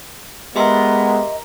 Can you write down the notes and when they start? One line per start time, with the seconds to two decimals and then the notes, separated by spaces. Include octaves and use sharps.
0.56 G#3 B3 G4 A#4 D#5 E5 C6